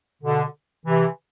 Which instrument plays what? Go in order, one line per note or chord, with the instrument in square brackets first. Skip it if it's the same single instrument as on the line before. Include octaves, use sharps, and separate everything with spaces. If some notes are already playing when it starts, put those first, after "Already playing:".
[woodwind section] B2 D3
C3 E3